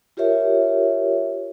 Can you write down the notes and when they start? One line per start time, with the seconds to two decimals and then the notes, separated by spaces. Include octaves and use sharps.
0.17 F4 G4 A#4 C#5 E5